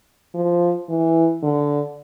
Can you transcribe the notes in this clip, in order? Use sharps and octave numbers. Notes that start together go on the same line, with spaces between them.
F3
E3
D3